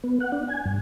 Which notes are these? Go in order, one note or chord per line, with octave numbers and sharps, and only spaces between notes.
B3
F#5
D4
G#5
G2